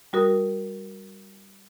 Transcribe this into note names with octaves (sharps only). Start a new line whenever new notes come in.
G3 F#4 A#4 D#6